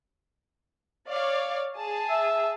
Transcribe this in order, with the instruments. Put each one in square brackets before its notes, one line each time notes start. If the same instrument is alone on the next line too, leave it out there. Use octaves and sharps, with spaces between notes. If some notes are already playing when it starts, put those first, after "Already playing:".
[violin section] C#5 D5 F5
G#4 A5
[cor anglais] E5